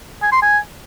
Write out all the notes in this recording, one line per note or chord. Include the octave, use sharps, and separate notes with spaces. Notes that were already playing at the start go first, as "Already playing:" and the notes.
G#5
C6
G#5